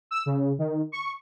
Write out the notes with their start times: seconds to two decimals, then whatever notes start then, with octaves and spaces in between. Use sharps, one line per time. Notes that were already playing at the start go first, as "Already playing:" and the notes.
0.11 E6
0.26 C#3
0.59 D#3
0.92 C#6